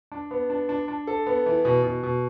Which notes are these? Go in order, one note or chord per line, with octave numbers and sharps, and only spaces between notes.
D4
B3
D4
D4
D4
A4
B3
E3
B2
B2
B2